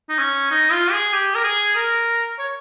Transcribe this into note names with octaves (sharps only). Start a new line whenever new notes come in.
D#4
C#4
D#4
F4
G#4
G4
A#4
G#4
A#4
C#5